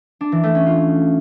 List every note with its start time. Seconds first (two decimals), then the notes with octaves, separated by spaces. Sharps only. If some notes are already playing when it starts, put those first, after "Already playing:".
0.21 D4
0.32 E3
0.43 A3
0.55 C#4
0.66 F4